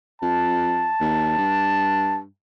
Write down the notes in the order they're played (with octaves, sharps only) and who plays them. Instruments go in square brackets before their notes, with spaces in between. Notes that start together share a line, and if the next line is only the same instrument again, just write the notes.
[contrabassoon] F2 [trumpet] A5
[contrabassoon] D#2
G2